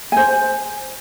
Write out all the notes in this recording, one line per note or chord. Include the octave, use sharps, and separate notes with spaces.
C5 G#5